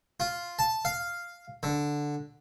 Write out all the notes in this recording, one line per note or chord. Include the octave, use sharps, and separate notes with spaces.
F4
A5
F5
D3